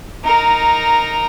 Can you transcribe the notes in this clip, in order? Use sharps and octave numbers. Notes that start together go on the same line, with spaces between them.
D#4 A#4